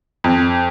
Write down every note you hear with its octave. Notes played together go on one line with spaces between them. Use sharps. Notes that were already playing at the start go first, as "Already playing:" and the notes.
F2